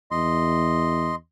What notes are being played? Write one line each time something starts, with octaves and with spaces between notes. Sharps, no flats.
E2 D#5 C6